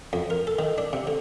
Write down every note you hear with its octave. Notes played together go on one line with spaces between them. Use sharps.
F2
A#4
A4
D#3
D4
C3
D3